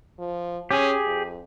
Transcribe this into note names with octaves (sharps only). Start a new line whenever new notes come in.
F3
C#4 G4 G#4
F2